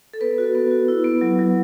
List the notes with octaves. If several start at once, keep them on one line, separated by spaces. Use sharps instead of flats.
A4
B3 B4
F#4
B3
F#4
E4
B3
F#3
F#3